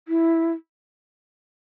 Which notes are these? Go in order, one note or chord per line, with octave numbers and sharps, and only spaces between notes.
E4